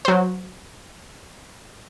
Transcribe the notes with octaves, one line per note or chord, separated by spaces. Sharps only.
F#3 C5